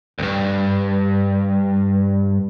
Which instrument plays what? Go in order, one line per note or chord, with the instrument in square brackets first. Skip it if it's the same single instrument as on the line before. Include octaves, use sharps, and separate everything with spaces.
[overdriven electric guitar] C2 G2